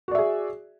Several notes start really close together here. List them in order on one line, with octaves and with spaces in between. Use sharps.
F#4 D5 E5 G#4